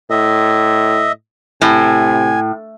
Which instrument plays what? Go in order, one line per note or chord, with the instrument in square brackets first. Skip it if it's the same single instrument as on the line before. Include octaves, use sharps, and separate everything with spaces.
[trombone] A2 [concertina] D#5 E5
[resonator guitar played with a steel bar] A2 [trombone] C3 [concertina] G#5